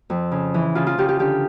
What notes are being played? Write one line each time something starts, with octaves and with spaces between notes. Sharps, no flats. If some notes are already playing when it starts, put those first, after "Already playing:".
F2
C#3
E3
C#3 F4
F4
C#3 G4
G4
D3 G4